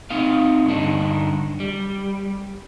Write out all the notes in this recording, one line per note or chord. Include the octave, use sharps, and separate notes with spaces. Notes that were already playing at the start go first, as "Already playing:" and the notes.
C4 D#4 F5
G2 D3 D4 D#4
G3